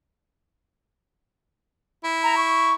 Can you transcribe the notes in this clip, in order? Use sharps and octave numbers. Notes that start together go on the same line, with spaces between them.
E4
A#5
C#6